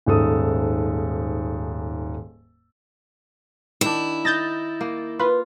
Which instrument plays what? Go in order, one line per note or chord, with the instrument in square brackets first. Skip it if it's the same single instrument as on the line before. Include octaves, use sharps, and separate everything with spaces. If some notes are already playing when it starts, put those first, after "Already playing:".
[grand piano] D#1 G#2 A4 D#6
[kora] D#3 D4 [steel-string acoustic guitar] E4
[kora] D#4 [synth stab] G6 A6 A#6
[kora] A#3
[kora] F4 [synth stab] B4